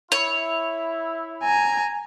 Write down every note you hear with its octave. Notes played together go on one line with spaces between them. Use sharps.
E4 C#5
G#5 A#5